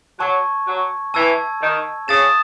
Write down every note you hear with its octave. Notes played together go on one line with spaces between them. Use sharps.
F#3 A5 C#6 G#6
F#3
E3 A5 E6 G#6
D#3
C#3 D#6 A6 E7